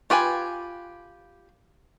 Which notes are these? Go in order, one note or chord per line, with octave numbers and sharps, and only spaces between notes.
F4 G4 B4 G#5